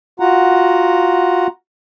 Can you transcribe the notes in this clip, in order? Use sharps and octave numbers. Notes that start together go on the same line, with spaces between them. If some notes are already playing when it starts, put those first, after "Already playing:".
F4 F#4 F#5 A#5